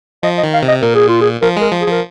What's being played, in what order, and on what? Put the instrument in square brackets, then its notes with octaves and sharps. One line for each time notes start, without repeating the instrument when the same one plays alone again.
[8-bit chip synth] F3 [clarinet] D#5
[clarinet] D#5
[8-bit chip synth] D#3
[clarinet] F5
[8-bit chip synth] C3
[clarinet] D#5
[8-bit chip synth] A#2 [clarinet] A#4
[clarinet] G#4
F4
G#4
[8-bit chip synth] F3 [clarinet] A#4
[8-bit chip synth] G#3 [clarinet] A#4
[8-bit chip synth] F3
[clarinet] G#4
[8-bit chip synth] F3 [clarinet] A#4